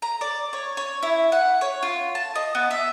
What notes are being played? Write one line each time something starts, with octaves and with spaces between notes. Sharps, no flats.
A#5
D5
C#5
C#5
E4
F#5
C#5
F4
A5
D#5
B3
E5